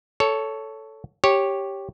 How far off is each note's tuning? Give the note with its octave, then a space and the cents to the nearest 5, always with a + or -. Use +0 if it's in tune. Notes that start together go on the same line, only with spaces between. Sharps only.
A4 +0 C#5 +10
G4 +0 C#5 -10